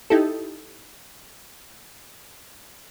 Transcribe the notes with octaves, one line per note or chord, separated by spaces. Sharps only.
D#4 E4 G4 A4